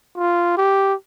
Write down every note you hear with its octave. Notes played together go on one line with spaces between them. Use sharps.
F4
G4